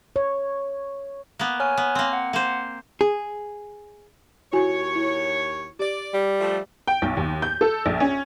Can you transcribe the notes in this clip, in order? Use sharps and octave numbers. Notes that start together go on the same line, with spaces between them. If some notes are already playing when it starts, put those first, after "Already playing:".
C#5
A#3 B3
C#5 G#5 F6
B3
A#3 C4
F#5
A#3 C5
G#4
D#2 E4 F#4 C#5 G#5
E4
G4 D5
G3
F3 A3
G5
B1
D#2
G6
A4
A#1
C#4